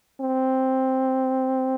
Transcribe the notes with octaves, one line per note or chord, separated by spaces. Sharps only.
C4